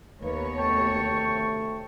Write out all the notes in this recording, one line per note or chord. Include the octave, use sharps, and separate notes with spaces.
D#2 A#3 B3 D#4 B4 C#5
D2 C3 A3 G5 A5 C#6